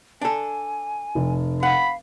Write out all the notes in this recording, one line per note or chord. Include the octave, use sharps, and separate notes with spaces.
D4 A4 G#5
F1
F5 F#5 B5